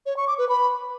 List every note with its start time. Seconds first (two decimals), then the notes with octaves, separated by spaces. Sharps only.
0.06 C#5
0.17 C#6
0.27 D6
0.38 B4
0.49 B5